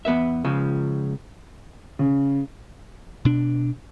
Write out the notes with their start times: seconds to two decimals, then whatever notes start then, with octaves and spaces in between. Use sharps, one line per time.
0.05 E2 B3 B4 E5
0.45 C#2 C#3 F3
1.99 C#3
3.25 B2 D4